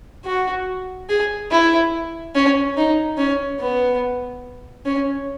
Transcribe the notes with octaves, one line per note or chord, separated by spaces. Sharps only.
F#4
G#4
E4
C#4
D#4
C#4
B3
C#4